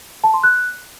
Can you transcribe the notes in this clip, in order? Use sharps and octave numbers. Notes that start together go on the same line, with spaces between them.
A5
C6
F#6